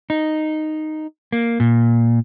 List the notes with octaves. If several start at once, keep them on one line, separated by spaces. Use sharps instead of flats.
D#4
A#3
A#2